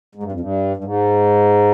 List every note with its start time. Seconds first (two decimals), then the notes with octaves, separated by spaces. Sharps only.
0.15 G#2
0.23 G2
0.32 F2
0.40 G2
0.77 G2
0.84 G#2